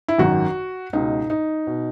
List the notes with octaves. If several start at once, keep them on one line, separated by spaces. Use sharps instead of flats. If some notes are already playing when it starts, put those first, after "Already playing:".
E4
G#1 F#2 D#3 F#4
C#2 B2 D#4
D#4
B2